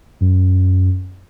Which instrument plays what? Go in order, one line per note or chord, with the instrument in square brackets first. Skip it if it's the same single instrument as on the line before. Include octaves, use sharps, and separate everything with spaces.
[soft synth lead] F#2